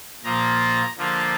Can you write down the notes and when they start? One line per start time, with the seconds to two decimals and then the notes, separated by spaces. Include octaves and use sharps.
0.24 A#2 F3 A#3 F4 A#5
0.97 D3 F3 A#3 F4